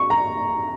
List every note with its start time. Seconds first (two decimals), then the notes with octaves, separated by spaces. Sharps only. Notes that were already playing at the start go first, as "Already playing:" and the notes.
Already playing: C#6
0.10 A#5